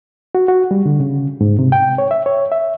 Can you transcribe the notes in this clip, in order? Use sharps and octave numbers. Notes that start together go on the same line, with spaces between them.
F#4
F#4
G3
D3
C#3
G#2
C3
G5
C#5
E5
C#5
E5